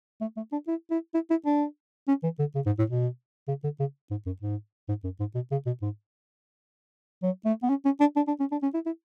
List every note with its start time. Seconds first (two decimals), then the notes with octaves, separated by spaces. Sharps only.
0.21 A3
0.37 A3
0.52 D4
0.68 E4
0.91 E4
1.14 E4
1.30 E4
1.46 D4
2.08 C#4
2.23 E3
2.39 D3
2.55 C#3
2.66 G#2
2.79 A2
2.90 B2
3.48 C#3
3.64 D3
3.80 C#3
4.11 G#2
4.26 F#2
4.41 G#2
4.89 G#2
5.04 F#2
5.20 G#2
5.35 B2
5.51 C#3
5.66 B2
5.82 G#2
7.23 F#3
7.46 A3
7.63 B3
7.69 C#4
7.85 C#4
8.00 D4
8.16 D4
8.28 D4
8.40 C#4
8.52 D4
8.63 C#4
8.74 E4
8.86 E4